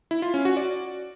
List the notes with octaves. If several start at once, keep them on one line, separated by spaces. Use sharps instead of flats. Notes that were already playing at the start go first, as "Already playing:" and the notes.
E4
F4
C#4
F#4
D5